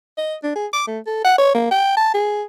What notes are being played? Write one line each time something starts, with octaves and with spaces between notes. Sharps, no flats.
D#5
D4
G#4
D6
A3
A4
F#5
C#5
A#3
G5
A5
G#4